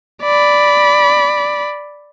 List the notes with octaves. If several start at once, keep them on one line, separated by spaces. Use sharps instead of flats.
D5 B5